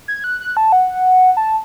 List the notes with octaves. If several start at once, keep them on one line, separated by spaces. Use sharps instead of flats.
G#6
F#6
F#6
A5
F#5
A5